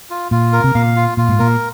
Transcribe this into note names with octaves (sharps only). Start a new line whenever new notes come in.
F4
A#2 F4
A#4
C3
A#2 F5
F4
A#2 F4
G#2
A#2 A#4